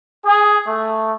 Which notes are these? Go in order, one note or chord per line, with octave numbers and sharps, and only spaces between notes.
G#4
A3